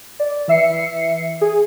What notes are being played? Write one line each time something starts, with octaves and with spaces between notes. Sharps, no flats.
D5
E3 E5 C7 C#7
G#4